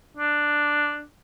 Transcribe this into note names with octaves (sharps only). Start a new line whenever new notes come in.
D4